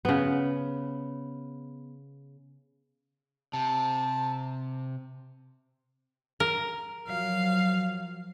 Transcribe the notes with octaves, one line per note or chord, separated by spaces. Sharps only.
C#3 B3
C3 A5
A#4
F3 F#3 F5